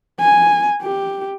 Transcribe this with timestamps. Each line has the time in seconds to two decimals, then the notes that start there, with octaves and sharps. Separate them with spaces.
0.20 G#5
0.82 G4